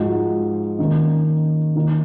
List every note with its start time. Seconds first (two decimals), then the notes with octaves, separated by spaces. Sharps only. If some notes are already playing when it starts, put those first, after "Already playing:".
Already playing: G#2 F3 G#3 D#4 F#4
0.79 D#3 A#3 C#4
1.75 D#3 A#3 D#4